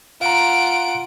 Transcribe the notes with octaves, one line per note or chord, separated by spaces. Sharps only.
F4 F5 F#5 A#5 D7